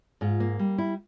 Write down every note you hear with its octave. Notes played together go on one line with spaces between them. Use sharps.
G#2 F4
A#3
G3
E4